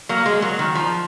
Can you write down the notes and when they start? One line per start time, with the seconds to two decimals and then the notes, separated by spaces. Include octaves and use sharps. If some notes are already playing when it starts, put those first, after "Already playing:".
0.09 F#3 A#3
0.26 G#3
0.42 F#3
0.59 D#3
0.75 F3